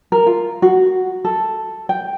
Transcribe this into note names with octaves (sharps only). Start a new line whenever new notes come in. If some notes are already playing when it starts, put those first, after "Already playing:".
A#4
F4
F#4
A4
G5